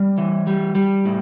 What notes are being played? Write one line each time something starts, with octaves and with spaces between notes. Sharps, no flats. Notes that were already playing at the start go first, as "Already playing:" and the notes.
Already playing: G3
E3
G3
G3
A2